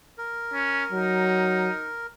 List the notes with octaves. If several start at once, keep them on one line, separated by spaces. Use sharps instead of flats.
A#4
C#4
F#3 D#4